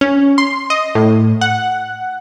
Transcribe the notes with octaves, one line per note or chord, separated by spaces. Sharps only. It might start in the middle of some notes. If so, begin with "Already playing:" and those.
C#4
C6
D#5
A2
F#5